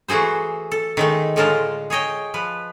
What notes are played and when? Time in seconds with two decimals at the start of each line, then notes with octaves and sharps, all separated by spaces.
0.08 E3 A3 F#4 G#4 C5
0.72 A4
0.97 D#3 G#3 A3
1.36 A2 D3 G#3 F4 A#4 A5
1.90 G#4 C#5 D#5 G5
2.34 F3 B4